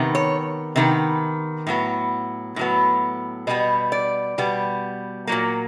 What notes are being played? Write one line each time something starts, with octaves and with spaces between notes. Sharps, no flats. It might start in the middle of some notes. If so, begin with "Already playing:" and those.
Already playing: C3 D#3 B3
C#5
C3 D#3 B3
A2 F#3 B3
A2 F#3 B3
B2 G3 B3 D#5
D5
B2 G3 B3
A#2 F#3 A#3